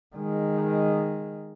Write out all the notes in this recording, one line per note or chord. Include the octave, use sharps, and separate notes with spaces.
D#3 G#3